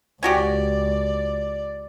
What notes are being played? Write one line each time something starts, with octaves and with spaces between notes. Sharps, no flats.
C#2 C#4 F#4 G4 D5